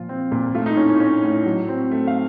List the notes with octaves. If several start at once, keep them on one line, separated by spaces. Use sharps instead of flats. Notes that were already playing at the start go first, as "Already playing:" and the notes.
Already playing: A#2 F3 F4
C4
A#2
A3 F4
D#4
A2 C#4
C#4
C#4
A2
F#3
C4
A3
F5